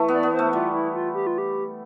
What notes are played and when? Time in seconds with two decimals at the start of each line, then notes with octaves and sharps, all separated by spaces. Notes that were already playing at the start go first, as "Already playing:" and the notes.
Already playing: E3 A3
0.08 B3 D5
0.23 B3
0.34 C5
0.39 A3
0.53 G3 F4
0.74 E4
0.94 F4
1.14 G4
1.27 F4
1.38 G4